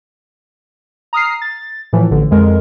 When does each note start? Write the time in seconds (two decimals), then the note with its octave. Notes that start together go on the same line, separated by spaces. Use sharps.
1.13 A#5 D#6 F6 C7
1.42 A6
1.93 A2 E3 F3
2.11 A1 D3
2.31 F2 G#3 A#4